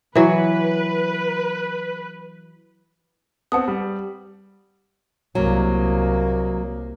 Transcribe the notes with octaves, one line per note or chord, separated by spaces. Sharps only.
E3 F#3 B4
B3 C4 F#5 A5 D#6
G3
C2 F#3 A#3